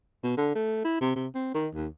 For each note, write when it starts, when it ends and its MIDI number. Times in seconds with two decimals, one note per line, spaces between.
0.23 0.33 47
0.37 0.52 50
0.55 0.83 57
0.84 1.00 64
1.01 1.14 48
1.16 1.27 48
1.35 1.50 60
1.54 1.68 51
1.74 1.87 39